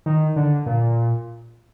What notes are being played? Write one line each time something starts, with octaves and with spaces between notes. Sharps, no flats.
D#3
D3
A#2